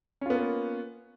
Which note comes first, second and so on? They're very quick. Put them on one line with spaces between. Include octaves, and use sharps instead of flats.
C#4 F4 B3 A#3